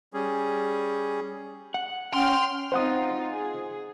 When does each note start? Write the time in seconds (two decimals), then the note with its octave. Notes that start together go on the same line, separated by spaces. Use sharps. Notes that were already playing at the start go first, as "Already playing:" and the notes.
0.14 G3 C#4 G#4
1.74 F#5
2.14 C#4 G5 C6 F6
2.72 C4 D#4 F4 C5 F#5 D#6
3.32 G#4